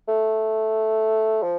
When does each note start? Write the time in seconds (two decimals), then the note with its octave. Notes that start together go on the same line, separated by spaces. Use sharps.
0.08 A3
1.43 F3